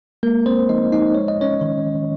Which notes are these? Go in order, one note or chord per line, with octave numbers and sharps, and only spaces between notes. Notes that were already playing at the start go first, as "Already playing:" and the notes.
G#3 A#3 A#4
C4 C5
F3 D#4 D#5
D#4 D#5
G#3 C#5
D#5
C#4 C#5
D#3